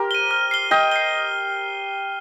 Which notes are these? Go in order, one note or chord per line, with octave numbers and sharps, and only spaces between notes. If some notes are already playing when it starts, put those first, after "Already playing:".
Already playing: G4 A#4 C5
D#7 G7
F6
C7 G7
D#5 G5 F6
C7 G7